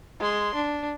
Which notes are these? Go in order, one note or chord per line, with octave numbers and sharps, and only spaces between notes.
G#3 C6
D4